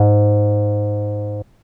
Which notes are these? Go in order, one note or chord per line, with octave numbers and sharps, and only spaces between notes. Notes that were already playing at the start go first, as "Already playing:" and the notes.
Already playing: G#2